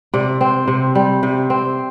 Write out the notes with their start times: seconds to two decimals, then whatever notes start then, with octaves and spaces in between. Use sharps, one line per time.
0.14 C3 D5
0.41 C4
0.68 C3
0.95 G3
1.23 C3
1.50 C4